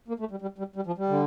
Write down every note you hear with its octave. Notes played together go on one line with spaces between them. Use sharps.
A#3
A3
G3
G3
G3
G3
F3
G3
D3